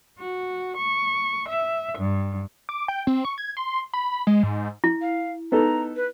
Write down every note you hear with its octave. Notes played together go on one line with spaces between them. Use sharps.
F#4
C#6
E5
G2
D6
G5
C4
C#6
G#6
C6
B5
G#3
G#2
E4
F5
B3 D#4 A4 A#5
B4